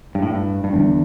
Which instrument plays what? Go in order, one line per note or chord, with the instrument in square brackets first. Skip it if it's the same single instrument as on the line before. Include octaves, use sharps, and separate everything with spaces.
[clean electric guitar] G2
A2
G2
G2
[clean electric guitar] E2 [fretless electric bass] D3 G3 D4